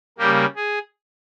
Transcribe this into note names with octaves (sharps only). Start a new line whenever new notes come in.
C#3 G3 A#3 G4
G#4